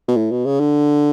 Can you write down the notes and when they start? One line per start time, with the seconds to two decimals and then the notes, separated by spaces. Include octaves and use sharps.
0.08 B2
0.16 A2
0.31 B2
0.46 C#3
0.60 D3